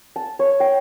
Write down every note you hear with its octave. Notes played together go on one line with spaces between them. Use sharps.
A5
C#5
G5